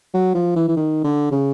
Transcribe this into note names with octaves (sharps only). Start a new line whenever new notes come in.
F#3
F3
E3
E3
D#3
D3
C#3